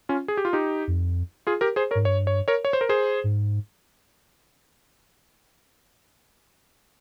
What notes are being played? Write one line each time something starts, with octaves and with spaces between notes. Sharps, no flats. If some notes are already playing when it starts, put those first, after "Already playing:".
C#4 F4
G#4
G4
F4
D#4 G4
F2
F4 G#4
G4 A#4
G#4 C5
A#4 C#5
G#2
G2 C#5
C#5
A#4 C#5
C#5
C5
A#4
G#4 C5
G#2